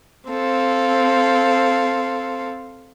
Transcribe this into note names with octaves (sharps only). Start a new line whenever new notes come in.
C4 A4 F5